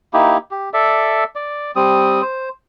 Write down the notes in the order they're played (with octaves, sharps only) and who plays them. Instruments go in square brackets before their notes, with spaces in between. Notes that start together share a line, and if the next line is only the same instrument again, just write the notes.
[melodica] A#3 D#4 E4 G4
G4
A4 D5 E5
D5
G3 C4 D#6
C5